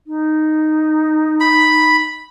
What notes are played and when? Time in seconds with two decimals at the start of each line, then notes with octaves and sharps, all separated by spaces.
0.07 D#4
1.40 B5